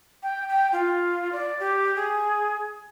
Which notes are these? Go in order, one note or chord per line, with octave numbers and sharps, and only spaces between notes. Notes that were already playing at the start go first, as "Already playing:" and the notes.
G5
G5
F4
D5
G4
G#4